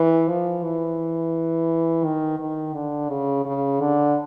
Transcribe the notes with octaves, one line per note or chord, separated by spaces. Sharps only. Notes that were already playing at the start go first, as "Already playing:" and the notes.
Already playing: E3
F3
E3
D#3
D#3
D3
C#3
C#3
D3